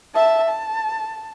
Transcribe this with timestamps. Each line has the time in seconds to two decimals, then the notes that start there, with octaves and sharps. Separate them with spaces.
0.14 E5 A5
0.49 A5